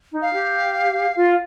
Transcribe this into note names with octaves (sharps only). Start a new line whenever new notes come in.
D#4
F5
G4
F4